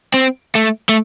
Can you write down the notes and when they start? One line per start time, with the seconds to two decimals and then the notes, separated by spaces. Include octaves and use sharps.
0.14 C4
0.55 A3
0.89 A3